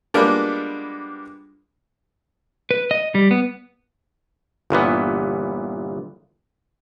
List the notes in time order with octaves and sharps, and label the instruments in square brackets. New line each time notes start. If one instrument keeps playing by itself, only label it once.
[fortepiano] G3 G#3 A#3 B3 D4 F4
[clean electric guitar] B4
D#5
G3
B3
[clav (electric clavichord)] G1 A#2 E3 B3